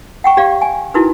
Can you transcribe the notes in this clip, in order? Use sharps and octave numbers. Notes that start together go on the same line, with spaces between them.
F#5 G5 C#6
G4 D5 F5
G#5
D#4 E4 F#4 A#4 B4